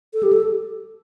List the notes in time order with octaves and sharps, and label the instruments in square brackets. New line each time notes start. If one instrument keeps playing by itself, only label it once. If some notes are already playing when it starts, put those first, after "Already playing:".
[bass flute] A4
G4
A4